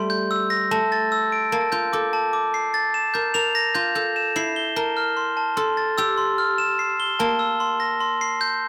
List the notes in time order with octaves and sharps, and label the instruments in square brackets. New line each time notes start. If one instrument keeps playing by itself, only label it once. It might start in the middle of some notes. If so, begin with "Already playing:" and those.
Already playing: [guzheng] G3 A3 [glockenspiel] C6
[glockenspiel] G6
E6
A#6
[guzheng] A3 [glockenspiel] A5
[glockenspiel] A6
E6
D7
[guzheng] A#3 [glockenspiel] A5
[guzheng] F4 [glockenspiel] G6
[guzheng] A4 [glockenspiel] D6
[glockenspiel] A5
D6
C7
A6
E7
[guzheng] A#4 [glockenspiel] G6
[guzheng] A#4 [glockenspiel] F7
[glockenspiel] A#6
[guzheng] F4 [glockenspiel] G6
[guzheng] A4 [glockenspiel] G6
[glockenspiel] E7
[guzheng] E4 [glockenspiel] C7
[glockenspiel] G7
[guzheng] A#4 [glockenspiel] A5
[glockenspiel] F6
C6
A5
[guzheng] A4 [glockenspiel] C6
[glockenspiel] A6
[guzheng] G4 [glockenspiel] E6
[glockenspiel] C6
F6
E7
C7
G7
[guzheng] A#3 [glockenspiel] A5
[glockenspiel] E6
C6
A#6
C6
C7
G6